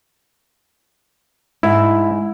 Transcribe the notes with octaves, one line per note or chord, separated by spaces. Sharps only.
G#2 E4